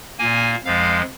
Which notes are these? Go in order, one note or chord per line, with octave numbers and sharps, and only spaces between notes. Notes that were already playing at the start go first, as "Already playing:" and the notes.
A#2 A#3 G#5
F2 F3 G#3 F5